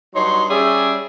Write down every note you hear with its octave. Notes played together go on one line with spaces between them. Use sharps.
G2 F#3 D#4 C#5 C6
G3 C#4 G4 G#4 D5 E5